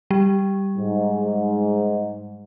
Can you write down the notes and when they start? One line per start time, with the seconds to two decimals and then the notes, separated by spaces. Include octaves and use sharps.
0.11 G3
0.78 G#2